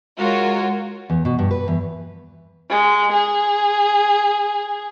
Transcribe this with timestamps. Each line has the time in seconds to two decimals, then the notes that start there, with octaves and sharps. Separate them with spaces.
0.19 G#3 F4 F#4 A#4 C#5
1.10 E2
1.25 B2
1.39 G2
1.51 B4
1.68 E2
2.68 G#3
3.12 G#4